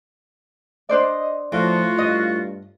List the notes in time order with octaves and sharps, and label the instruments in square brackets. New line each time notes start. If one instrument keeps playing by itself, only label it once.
[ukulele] D4 C5 D5 [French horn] D#5
[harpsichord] A2 [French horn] F3 [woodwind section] F4 F#4
[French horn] G2 [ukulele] D#5